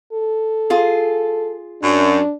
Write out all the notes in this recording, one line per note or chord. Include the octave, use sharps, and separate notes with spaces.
A4
F4 G#4
F#2 D4